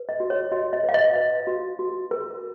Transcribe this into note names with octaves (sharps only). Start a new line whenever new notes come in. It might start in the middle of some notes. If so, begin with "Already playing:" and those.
Already playing: B4
D#5
F#4
C#5
F#4 D#5
D#5
B4
F5
D#5
B4
F#4
F#4
A#4